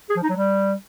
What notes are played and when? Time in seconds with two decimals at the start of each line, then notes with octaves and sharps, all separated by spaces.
0.10 G#4
0.16 F3
0.23 D#4
0.30 F#3
0.36 G3